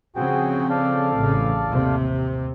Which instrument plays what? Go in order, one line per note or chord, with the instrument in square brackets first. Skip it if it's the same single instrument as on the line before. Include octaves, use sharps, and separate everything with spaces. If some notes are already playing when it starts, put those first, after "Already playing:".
[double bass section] C#3 F3 C4 [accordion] F#4 G#4 G5
[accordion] A4 D5 F5
[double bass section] A1 C#3
D#2 C3